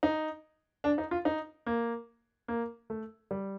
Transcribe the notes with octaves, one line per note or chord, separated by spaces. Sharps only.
D#4
D4
D#4
F4
D#4
A#3
A#3
A3
G3